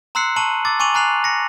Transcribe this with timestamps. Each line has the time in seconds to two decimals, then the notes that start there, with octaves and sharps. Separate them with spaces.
0.15 A#5 C6 E6 F#6 C7 C#7
0.36 A5 A#5 C#6 D#7 F#7
0.65 D6 E6 A6
0.79 G#5 C#6 D6 D#7 F7 F#7
0.94 G#5 A#5 F#6 C7 F7 F#7
1.24 A#6 C#7